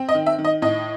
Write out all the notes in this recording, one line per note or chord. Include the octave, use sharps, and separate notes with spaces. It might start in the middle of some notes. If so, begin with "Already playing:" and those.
Already playing: C4
D#5
D#3
E5
D#3
D#5
A2 D#5